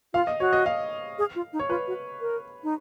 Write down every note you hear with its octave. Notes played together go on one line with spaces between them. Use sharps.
F4 F5
D#5
F#4 C#5
D#5
F5
G#4
F4
D#4
C#5
F4 B4
F#4
A#4
D#4